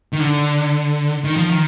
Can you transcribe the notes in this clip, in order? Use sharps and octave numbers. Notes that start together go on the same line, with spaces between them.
D#3
D3
D#3
F3
D#3